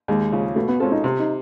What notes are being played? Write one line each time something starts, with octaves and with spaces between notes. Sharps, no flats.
D#2 G#3
C#3 F3
B2 A3
B3
G#3 C4 C#4 F4 A4
D#4
C3
D#4